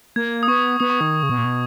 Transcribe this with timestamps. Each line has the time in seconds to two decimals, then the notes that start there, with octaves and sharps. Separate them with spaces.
0.16 A#3 G#6
0.43 D#6
0.48 B3 C#6
0.80 B3 D#6
0.90 C#6
1.01 D#3 D#6
1.23 C#3
1.30 B2
1.38 A#2
1.45 B2